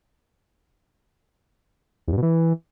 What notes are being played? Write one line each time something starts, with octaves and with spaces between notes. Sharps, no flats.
E2
G2
B2
E3